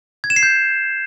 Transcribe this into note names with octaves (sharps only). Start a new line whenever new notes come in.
G#6
E7
C7
G6